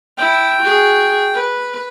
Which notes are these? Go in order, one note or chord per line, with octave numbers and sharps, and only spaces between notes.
E4 G5
F#4 G#4
B4